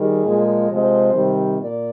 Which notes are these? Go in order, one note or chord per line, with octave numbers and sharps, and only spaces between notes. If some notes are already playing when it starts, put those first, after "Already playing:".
Already playing: D#3 G3 G#4
A#2 F3 G#3
C3 F3 G#3 C5
C3 D#3 G3
A#2 D5